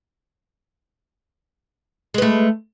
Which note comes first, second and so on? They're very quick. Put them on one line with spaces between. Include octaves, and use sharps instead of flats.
G#3 B4 A3